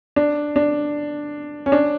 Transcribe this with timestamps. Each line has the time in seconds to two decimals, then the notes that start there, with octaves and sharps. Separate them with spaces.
0.16 D4
0.56 D4
1.66 C#4
1.72 D4